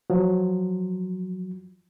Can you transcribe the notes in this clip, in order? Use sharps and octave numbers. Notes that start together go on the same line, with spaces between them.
F3 F#3